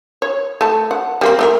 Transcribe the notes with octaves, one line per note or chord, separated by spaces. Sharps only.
C#5
A3 A5
F#5
G3 A#3 C4
A3 G4 A#4